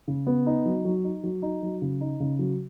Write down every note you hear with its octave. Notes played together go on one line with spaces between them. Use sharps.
C#3
B3
D#4
F#3
F#3
D#4
F#3
D#4
F#3
C#3
D#4
C#3
F#3